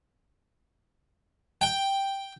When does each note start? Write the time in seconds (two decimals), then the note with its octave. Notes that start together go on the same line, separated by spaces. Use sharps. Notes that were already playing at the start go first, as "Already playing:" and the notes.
1.61 G5